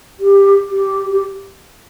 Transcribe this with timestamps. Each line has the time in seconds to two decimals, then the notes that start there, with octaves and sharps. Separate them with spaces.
0.19 G4
0.70 G4
1.12 G4